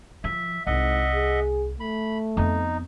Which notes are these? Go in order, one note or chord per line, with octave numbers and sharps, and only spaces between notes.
F3 E5
C2 G#2 D#5 E5 F#5
G#4
A3 B5
F2 B3 D#4